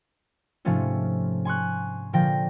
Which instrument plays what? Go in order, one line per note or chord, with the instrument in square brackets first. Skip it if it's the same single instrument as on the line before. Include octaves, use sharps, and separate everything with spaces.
[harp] G#2 C3 F3 A3 C#4 F4
G#5 C6 C#6 F#6
A#2 D3 F3 G5 A#6